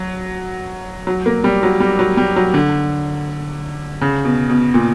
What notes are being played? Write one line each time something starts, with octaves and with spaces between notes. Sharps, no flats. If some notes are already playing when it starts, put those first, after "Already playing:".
Already playing: F#3
F#3
A#3
G3
F#3
G3
F#3
G3
F#3
D3
C#3
B2
B2
A#2